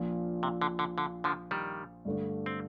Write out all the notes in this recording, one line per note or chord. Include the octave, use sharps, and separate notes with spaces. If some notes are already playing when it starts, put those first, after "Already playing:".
Already playing: A#1 A#2 F3
C3
D3
D3
D3
D3 F3
D#3 G3
G2 D3 A3 D4
C4